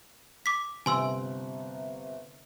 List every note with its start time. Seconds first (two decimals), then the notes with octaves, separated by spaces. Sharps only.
0.46 D6 B6
0.86 G1 C3 G#5 C6 E6